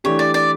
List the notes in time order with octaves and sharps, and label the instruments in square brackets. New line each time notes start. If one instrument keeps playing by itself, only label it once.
[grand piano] E3 A3 D4 G4 [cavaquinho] C#5
[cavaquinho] D5
D5